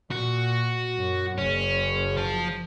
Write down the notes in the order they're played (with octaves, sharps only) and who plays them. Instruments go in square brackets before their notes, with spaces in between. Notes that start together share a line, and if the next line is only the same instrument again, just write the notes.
[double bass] A#2 [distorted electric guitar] F#4
[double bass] F#2
[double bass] F#1 [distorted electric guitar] C#4
[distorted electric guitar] F3 A5